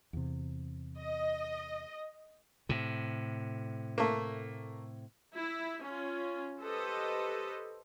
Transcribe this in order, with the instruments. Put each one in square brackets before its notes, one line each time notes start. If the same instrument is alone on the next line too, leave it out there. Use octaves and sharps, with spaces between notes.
[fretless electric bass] E2 C3
[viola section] D#5
[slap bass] A2 C3
[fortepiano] A3 A#3
[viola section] E4
C#4 F4
G4 A4 B4 C5 D#5